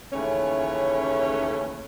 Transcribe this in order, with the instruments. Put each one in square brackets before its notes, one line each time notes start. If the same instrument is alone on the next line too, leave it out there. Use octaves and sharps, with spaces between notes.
[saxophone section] D#2 C#3 E3 A3 C#4 C#5